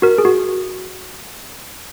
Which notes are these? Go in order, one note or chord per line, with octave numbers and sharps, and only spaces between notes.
F#4 A#4
G#4
F#4